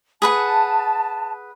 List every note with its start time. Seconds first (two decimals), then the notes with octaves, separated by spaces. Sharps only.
0.22 G#4 B4 F#5 A5